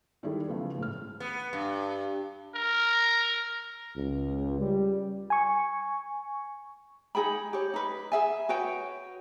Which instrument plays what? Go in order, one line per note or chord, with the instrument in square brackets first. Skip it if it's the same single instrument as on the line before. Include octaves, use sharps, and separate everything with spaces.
[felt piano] D#3 G3 G#3 E4 G#4 A4
C#3 F3 F#3 A3 B3
A1 G#3 F6
[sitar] B3
G2
[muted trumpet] A#4
[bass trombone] C#2
G3
[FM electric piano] G#5 C#6
[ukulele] D#4 G#4 G5 B5
G4 C#5
D#4 B4
G#4 E5 G#5
F#4 B4 C#5 G5